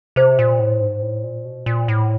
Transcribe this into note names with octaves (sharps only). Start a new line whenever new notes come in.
C3 C5
A#2
A2
G#2
A2
A#2
B2
A#2
A2